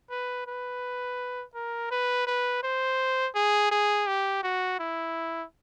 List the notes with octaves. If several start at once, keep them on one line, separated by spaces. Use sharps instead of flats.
B4
B4
A#4
B4
B4
C5
G#4
G#4
G4
F#4
E4